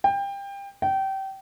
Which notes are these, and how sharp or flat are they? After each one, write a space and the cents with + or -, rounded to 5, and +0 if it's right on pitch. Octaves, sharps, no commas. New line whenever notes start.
G5 +25
G5 -25